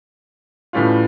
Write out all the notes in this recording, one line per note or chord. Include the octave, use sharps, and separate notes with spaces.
A2 E3 G3 C#4 F4